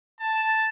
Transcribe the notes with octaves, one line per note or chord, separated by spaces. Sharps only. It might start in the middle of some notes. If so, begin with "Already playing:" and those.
A5